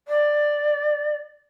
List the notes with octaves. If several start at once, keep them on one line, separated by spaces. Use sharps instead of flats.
D5